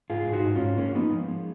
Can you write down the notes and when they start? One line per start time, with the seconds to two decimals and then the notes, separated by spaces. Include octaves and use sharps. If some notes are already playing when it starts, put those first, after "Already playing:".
0.10 G#2 F4 G#4
0.27 G#2
0.33 D#4 F#4
0.45 G#2
0.55 C#4 F4
0.61 G#2
0.78 G#3 A#3 C#4
0.95 F3 B3 D#4
1.12 F3
1.28 G#3